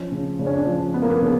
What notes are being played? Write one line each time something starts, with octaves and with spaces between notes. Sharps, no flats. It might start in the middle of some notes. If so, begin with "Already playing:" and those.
Already playing: F3 C#4
C#3
C#3 D4
C#4
D4
F3
F3 B3
A#3
B3
C#3